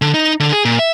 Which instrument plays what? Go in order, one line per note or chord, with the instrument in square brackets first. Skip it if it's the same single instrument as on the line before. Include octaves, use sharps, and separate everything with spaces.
[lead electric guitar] D3
D#4
D3
G#4
A#2
E5